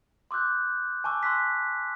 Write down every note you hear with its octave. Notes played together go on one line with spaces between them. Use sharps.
C6 D6 E6 F#6 G6
G#5 A5 C#6 D6 E6
C6 E6 F#6 B6